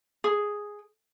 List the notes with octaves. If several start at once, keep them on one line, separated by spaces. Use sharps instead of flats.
G#4